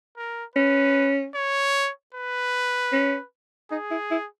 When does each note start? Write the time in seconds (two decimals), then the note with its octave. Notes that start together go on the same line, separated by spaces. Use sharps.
0.17 A#4
0.56 C#4 B4
1.35 C#5
2.14 B4
2.92 C#4
3.71 D#4 G#4
3.91 E4
4.11 E4